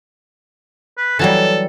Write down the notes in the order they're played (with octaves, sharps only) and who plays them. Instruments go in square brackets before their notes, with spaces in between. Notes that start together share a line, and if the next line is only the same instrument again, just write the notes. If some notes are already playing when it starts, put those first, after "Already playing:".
[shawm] B4
[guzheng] E3 F#3 G3 [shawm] A4